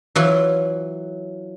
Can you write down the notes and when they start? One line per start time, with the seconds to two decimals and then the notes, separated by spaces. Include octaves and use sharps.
0.15 E3 F#3 F4